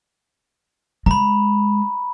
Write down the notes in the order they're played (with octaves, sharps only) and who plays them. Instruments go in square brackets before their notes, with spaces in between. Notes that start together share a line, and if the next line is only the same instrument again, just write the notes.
[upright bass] G#3 [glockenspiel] A#5 B5